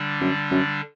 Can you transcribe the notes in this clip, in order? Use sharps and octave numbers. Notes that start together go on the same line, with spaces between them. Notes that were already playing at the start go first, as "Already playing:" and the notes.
Already playing: D3 G3 D4
F#2
F#2